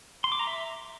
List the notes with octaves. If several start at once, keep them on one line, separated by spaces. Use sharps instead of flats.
C6
D6
A#5
E5